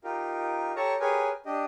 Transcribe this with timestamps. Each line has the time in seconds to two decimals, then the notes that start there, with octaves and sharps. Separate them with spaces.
0.04 D#4 F4 G4 A#4
0.76 G4 A4 C#5 A5 A#5 C#6
1.00 G4 G#4 A#4 B4 C#5 G#5
1.46 D4 G4 D#5